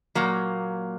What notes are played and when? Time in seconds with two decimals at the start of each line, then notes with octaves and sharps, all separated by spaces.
0.15 A#2 F#3 A#3